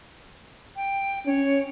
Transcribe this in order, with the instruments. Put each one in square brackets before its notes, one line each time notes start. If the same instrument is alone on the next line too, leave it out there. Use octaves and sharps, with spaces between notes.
[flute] G5
[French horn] C#4 [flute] C#5